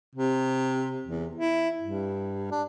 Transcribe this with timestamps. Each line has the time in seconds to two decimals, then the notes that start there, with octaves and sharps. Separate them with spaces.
0.15 C3
1.06 E2
1.35 E4
1.82 G2
2.51 D4